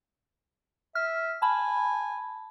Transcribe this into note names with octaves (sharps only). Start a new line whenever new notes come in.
E5 F6
G#5 A5 B5